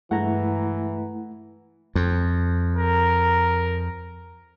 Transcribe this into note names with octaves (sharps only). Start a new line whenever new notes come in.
G2 E3 G#3 A3 E4 F#5 A#5
F2
A#4